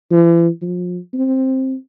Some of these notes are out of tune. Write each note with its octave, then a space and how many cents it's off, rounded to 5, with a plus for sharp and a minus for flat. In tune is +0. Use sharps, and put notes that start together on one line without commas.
E3 +40
F3 +35
C4 +10